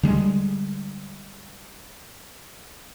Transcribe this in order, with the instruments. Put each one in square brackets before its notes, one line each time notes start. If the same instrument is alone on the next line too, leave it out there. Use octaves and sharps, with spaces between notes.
[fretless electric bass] D3 G3 G#3